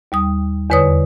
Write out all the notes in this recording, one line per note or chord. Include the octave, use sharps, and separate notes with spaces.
D#2 G3 D#6
E2 D3 B4 C#5 D#6